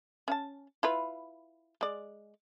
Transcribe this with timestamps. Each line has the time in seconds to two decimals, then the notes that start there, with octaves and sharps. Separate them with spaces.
0.28 C#4 F5 A5
0.83 E4 F4 B4
1.81 G#3 D5